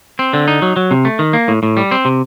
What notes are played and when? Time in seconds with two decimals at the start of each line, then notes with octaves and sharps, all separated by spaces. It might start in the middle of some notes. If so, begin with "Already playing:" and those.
0.19 C4
0.33 D3
0.48 D#4
0.62 F#3
0.76 F#3
0.91 C3
1.05 A3
1.19 D#3
1.33 A#3
1.48 A2
1.63 A2
1.77 G3
1.91 C4
2.05 C3